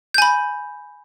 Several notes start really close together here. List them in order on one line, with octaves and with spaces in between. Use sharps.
G6 G#5 B5